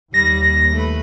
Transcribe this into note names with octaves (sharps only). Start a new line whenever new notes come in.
D#2 G3 A#6
A3 B4